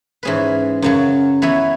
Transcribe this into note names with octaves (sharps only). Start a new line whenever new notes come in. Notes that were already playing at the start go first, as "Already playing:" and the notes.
G#2 E3 C#4 G#4 B4
F#2 C#3 F#3
E3 B3 E4 C#5